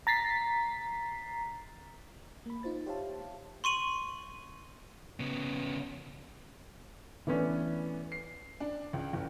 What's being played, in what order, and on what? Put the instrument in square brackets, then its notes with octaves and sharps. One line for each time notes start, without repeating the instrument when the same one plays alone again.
[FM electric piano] A#5 A6 B6 C7
A#3 B5
D#4 F4 C5 A6
G4 C5 C#5 E5 F5 A5
[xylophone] C6 C#6 D#7 F#7
[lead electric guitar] C#3 B3
[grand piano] E3 A3 B3 C#4 D4
C7
[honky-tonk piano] D4
C#2
F#1